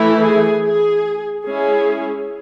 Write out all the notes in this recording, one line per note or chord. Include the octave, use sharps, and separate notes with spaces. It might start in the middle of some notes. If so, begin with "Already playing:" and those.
Already playing: E3 A3 E4
G#4
G#4
G#3 C#4 E4 G#4